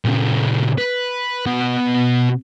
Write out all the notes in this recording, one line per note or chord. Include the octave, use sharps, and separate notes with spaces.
A#2 C#3
B4
B2 F#4